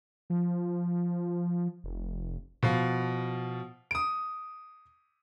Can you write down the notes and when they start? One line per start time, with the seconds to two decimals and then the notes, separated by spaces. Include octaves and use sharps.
0.30 F3
1.84 F1
2.63 B2 F3 F5
3.91 D#6 D7